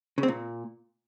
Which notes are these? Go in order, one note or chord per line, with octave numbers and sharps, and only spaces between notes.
C#3
C4
A#2